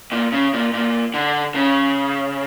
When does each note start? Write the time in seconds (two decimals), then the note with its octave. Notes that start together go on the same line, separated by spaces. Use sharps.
0.12 A#2
0.32 C#3
0.53 A#2
0.74 A#2
1.14 D3
1.55 C#3